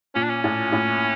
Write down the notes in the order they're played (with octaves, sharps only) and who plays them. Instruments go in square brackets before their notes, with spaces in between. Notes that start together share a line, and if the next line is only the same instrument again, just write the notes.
[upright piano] A#2 [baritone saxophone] C#4
[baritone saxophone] D4
C#4
[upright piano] A2
A2